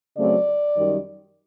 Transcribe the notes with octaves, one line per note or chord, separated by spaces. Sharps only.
C#3 F#3 A3 C4 D5
F#2 D#3 G3